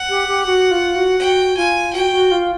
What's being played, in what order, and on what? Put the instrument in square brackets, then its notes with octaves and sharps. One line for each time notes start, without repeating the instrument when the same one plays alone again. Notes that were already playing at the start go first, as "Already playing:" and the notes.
Already playing: [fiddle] F#5
[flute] G4
G4
F#4
F4
F#4
[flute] F#4 [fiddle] G5
[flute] F4 [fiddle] G#5
[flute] F#4 [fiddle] G5
[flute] F#4
F4